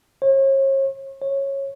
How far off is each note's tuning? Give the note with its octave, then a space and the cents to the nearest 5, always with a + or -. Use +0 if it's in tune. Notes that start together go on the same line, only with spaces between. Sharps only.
C#5 -40
C#5 -15